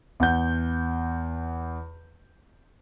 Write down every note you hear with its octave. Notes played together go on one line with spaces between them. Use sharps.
E2 F#5 G6